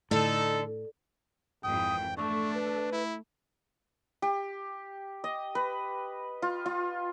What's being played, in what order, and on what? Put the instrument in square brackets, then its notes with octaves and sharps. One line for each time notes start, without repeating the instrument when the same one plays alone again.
[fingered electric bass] A2 [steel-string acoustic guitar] D3 [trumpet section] D#4 A4
[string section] G#1 F2 E3 [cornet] G5 [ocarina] D#6
[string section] A3 [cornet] D4 [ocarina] C#6
[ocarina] B4
[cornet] E4
[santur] G4
D#5
B4
F4
F4